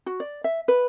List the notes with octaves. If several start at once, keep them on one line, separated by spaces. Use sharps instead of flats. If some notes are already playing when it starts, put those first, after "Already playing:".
F#4
D5
E5
B4